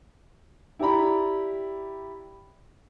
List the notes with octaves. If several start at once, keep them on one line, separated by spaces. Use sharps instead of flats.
E4 G4 D5 A#5 B5